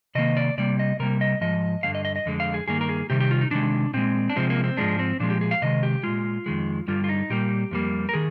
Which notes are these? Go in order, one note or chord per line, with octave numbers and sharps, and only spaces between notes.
C3 D#3 A#3 D#5
D5
C3 G3 A#3 D5
D#5
C3 G3 A#3 A#4
D#5
G#2 F3 D#5
G2 D3 G#3 F5
D#5
D#5
D#5
F2 D3 G#3
F5
G#4
G2 D#3 A#3 G#4
A#4
G#4
C3 D#3 G3 G4
G4
F4
D#4
C3 D#3 G#3 D4
A#2 G#3 C4
D4
C3 F3 G#3 C4
A#3
C4
G#2 F3 G#3 D4
C4
A#2 F3 G#3 D4
G4
G#4
F5
C3 D#3 G#3 D#5
G4
A#2 G#3 F4
F2 D#3 G#3
G2 D3 G3 F4
F4
D#4
A#2 G3 A#3 G4
F2 D3 G3 A#3
A#4
D#3 G#4